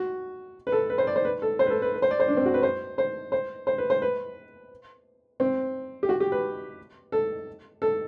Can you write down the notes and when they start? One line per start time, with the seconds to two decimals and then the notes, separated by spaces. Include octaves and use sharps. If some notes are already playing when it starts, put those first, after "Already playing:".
Already playing: F#4
0.67 B4
0.72 A4
0.90 B4
0.98 C5
1.07 D5
1.16 C5
1.25 B4
1.42 A4
1.59 C5
1.66 B4
1.70 A4
1.82 B4
1.94 B4
2.02 C5
2.11 D5
2.20 C5
2.28 D4
2.37 C4
2.46 F#4
2.54 B4
2.63 C5
2.98 C5
3.32 C5
3.67 C5
3.78 B4
3.90 C5
4.02 B4
5.40 C4
6.03 G4
6.09 F#4
6.20 G4
6.32 B4
7.12 A4
7.82 A4